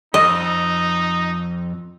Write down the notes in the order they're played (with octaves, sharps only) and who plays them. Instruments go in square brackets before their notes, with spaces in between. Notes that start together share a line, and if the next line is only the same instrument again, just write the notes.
[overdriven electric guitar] F2 [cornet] D#4 [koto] D#5